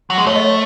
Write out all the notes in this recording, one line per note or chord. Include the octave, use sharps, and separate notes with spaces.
F#3
G#3
A3 C#5
D#5
C#5